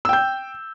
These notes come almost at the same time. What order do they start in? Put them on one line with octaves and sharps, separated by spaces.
E6 G5 G6